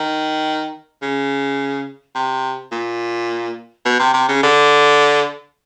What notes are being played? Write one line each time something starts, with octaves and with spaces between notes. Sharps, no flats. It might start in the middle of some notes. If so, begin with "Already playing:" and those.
Already playing: D#3
C#3
C3
A#2
B2
C3
C3
C#3
D3